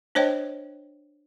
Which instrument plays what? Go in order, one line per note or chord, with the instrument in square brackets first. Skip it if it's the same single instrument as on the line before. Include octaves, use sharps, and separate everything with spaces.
[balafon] D4 C5 C#5 D#5 G5